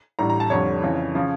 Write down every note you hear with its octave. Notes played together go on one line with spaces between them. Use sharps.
A1 A2 G3 D4 A#5
A#5
A5
F1 F2 D3 G3 C#5
F2 C#3 E3
C#3 F3